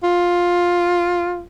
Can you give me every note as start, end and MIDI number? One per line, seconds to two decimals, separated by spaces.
0.04 1.43 65